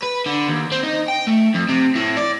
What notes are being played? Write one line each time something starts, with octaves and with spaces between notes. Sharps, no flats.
B4
D3
D#2
C4
D#4
G5
A3
F2
C3
A2
D5